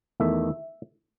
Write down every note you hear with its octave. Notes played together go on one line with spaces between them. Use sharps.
E2 D#3 A3 E5